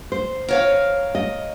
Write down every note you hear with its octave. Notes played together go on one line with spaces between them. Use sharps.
C5
A#4 C#5 F5
D#5